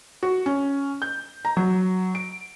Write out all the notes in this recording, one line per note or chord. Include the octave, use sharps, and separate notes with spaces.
F#4
C#4
G6
A#5
F#3
D7